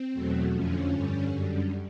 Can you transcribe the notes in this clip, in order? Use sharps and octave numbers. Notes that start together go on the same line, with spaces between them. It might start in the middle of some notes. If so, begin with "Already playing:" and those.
Already playing: C4
E2 B2 F#3 A3
F2 D3 F3 C#4
G2 D3 G3
F#2 D3 G3